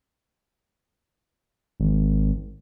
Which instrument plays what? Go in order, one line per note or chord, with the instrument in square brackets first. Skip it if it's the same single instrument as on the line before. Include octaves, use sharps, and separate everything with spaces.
[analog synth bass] G#1